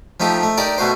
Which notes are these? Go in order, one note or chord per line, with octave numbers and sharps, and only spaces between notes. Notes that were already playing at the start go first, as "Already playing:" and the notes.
F3 A3 D#4 G4
A3
D#4 G4 A#4 D5
B2 A3 F#4 C5